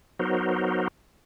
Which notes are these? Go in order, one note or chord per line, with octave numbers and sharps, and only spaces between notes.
F#3 B3 D#4 F#4 A#4 C5